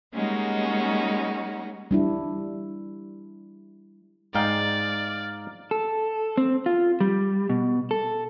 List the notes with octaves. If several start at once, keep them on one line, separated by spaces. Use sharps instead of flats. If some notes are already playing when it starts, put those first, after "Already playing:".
G3 G#3 A#3 C#4 D#4 F#4
G3 D4 E4
G#2 G#3 D#4 D5 F5 G5
A4
C4
F4
G3
B2
A4